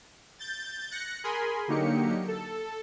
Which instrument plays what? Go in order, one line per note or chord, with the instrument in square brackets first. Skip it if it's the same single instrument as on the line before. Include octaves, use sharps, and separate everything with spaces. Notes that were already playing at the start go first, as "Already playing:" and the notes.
[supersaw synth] G6 A6
F#6 A#6 C#7
G#4 A#4 G#5 B5 C6
D3 F#3 A#3 D#4 G4 C#7
A4